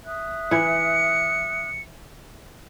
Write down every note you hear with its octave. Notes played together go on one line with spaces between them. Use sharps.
E5 D#6 F#6
E3 E4 C#7